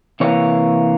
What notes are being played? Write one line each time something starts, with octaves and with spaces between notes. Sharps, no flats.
C3 E3 A#3 C#5